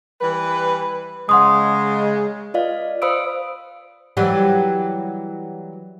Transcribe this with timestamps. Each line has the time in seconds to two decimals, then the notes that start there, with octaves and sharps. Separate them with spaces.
0.21 E3 G3 B4
1.29 C#3 G#3 F#5 C6 D#6
2.54 F4 B4 D5 D#5 F5
3.02 C5 F5 B5 D#6 E6 D7
4.17 E3 F#3 G3